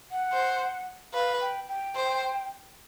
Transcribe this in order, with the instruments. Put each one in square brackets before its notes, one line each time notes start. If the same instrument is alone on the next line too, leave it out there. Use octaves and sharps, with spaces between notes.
[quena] F#5
[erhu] C5
[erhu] B4 [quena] F5
[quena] G5
G5
[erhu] C5